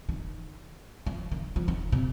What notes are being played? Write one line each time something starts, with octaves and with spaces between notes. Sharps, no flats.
D#3
F3
D#3
F3
D#3
C3